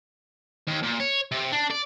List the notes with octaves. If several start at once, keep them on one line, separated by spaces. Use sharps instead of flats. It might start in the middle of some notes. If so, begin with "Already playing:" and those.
D#2
A#2
C#5
C3
D4
D5